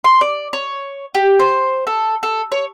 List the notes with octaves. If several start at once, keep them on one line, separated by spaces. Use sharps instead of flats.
C6
D5
C#5
G4
C5
A4
A4
C#5